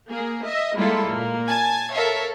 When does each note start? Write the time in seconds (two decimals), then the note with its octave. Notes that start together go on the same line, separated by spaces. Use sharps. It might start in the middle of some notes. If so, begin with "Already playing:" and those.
0.10 A#3 G#4
0.45 D#5 E5
0.75 G3 G#3 A#3 E4 F4 A4
1.08 A#2 A#3
1.47 G#5 A5 G#6
1.94 A4 A#4 C#5 E5 F5